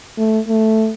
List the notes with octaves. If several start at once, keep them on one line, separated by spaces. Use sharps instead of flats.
A3
A3